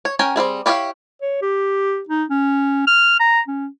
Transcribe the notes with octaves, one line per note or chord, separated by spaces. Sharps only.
C#5
C#4 A#4 G5 G#5
G3 C4 E4 G#4
E4 G4 C#5 D5 F5
C#5
G4
D#4
C#4
F6
A#5
C#4